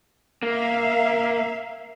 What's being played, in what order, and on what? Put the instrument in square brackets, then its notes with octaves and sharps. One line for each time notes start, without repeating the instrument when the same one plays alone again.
[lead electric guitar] A#3 [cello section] E5 F5